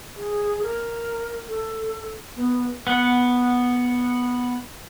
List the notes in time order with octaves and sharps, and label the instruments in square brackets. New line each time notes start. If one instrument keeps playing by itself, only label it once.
[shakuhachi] G#4
A#4
A4
B3
[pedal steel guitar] B3 F#5